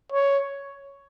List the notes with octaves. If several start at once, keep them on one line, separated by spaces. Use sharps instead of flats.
C#5